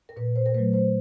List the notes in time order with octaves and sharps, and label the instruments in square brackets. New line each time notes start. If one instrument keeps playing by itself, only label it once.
[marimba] A#4
A#2 B4
C5
A#4
F#3 A3 B4
C5